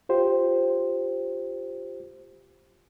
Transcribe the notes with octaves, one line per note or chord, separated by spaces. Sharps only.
F4 G4 C5